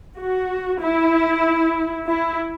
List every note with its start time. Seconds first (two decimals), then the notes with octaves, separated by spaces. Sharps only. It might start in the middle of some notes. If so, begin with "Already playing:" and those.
0.16 F#4
0.80 E4
2.07 E4